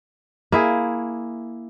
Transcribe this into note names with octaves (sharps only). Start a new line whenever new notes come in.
A#3 E4 G#4